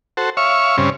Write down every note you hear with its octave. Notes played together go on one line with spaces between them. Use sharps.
F#4 A4 C5
C#5 E5 F5 C#6
G2 C#3 C4 C#4